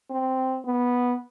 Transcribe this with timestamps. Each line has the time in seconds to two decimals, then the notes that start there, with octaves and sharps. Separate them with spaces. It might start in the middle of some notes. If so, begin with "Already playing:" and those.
0.11 C4
0.65 B3